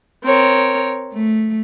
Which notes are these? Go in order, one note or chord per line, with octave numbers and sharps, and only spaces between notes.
C4 A#4 C#5
A3